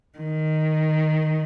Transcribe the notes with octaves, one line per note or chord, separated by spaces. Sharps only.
D#3